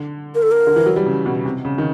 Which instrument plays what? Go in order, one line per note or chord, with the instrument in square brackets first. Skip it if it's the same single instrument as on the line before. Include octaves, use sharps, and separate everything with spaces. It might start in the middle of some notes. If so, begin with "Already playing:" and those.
Already playing: [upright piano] D3
[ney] A#4
A4
A#4
[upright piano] D3
E3
F#3
G3
C#3
B2
C3
C#3
D#3